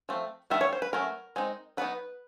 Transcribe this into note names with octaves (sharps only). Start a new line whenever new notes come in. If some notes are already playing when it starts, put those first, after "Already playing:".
F3 A3 C4
D#3 G3 B3 D4 E5
C#5
C5
B4
F#3 A3 C#4 A#4
G#3 C4 D#4
F#3 B3 D#4 B4